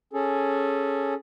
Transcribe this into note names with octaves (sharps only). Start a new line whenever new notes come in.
C#4 G#4 A4